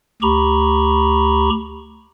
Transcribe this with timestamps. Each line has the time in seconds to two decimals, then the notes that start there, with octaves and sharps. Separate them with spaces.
0.22 D2 G4 A#5 B5 C#6